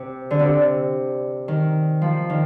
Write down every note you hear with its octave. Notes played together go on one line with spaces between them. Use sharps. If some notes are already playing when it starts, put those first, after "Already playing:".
Already playing: C3
D3
C3
D#3
F3
D#3